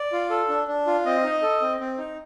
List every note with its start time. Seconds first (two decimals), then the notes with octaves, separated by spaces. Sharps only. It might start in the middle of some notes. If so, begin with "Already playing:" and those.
Already playing: D5
0.12 F4
0.30 A4
0.49 D4
0.68 D4
0.87 F4
1.06 C4 D#5
1.24 D#4
1.42 A4
1.61 C4
1.80 C4
1.98 D#4